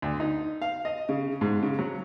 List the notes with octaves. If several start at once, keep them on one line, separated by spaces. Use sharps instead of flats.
D2
D#4
F5
D#5
C#3
G#2
C#3
F#3